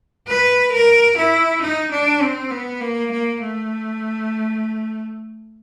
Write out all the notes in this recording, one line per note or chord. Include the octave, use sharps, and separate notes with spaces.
B4
A#4
E4
D#4
D4
C4
B3
A#3
A#3
A3